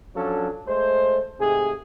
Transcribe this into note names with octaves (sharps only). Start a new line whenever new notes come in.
F3 F#3 C#4 D4 A4
G#3 A3 C5
G#2 C3 A3 G#4